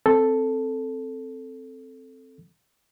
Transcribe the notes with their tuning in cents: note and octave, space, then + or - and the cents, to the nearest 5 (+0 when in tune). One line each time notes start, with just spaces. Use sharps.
C4 +0 A4 +0